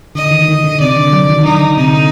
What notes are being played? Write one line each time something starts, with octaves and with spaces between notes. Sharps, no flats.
D3 D#5
D#3
D#3
D3
C3 D5
D3
F#3
D#3
D3 D#4
C3 D#4
D3